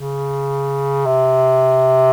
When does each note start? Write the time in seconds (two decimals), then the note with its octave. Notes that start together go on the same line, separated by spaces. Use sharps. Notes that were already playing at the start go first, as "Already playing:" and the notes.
Already playing: C#3
1.06 C3